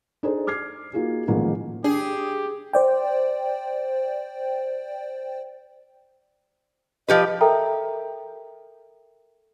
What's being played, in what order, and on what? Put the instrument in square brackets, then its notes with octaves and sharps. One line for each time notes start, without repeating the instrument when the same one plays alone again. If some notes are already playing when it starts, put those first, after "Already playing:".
[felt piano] D4 D#4 G#4 A4 C5 D5
D6 F6 G#6 C7
A#3 D#4 F4 F#4 G#4
A1 D#3 F3 G#3 A#3 A#4
[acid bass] D4 [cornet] G4 [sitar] G#4
[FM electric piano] C5 D5 G5
[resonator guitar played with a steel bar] F3 G4 B4 [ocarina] D#5
[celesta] A4 A#4 E5 G5 A#5